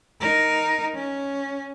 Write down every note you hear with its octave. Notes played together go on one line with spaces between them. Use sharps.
D#4 A#4
C#4